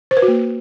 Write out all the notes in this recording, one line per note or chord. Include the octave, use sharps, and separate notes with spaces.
C5
B4
F#4
A#3